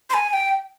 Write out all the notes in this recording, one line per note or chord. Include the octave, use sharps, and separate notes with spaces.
C6
G#5
G#5
G5